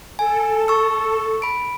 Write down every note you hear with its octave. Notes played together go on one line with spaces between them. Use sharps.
A4 G#5
C#6 E6
B5 D7